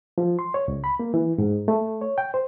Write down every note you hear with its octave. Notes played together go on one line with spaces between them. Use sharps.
F3
C6
C#5
C#2
B5
A#3
E3
G#2
A3
C#5
G5
C5